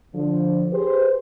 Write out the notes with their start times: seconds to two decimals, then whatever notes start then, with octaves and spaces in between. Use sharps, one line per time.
0.15 D3 F3
0.72 G4 G#4 B4 C5